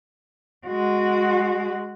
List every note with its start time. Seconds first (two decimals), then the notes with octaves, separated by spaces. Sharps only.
0.67 G#3 F#4